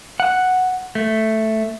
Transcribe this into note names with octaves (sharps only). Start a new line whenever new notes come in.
F#5
A3